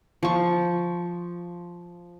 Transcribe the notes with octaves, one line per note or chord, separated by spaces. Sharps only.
F3 C#6